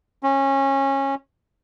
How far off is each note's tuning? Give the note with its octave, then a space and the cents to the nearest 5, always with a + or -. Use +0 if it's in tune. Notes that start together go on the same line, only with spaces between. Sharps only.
C#4 -20